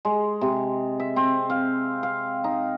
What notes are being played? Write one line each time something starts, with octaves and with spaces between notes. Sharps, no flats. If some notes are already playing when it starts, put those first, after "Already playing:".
G#3
C3
E5
C4
F5
F5
D#4